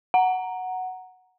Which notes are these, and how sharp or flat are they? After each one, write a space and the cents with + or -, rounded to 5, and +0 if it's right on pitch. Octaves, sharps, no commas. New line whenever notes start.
F#5 +0 A#5 +0